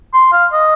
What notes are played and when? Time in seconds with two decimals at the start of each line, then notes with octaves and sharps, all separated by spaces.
0.14 C6
0.32 F5
0.53 D#5